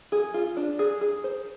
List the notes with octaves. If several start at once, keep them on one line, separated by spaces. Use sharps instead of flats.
G#4
F4
D4
G#4
G#4
C5